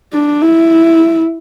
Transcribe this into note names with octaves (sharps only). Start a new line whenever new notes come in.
D4
E4